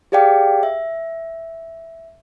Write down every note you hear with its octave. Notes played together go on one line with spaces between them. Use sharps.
G4 G#4 D5 F5 G5
E5